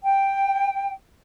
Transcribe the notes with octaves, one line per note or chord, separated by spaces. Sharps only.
G5